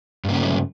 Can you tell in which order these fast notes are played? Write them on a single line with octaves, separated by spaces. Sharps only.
G2 A#3 C#3 A3 F#3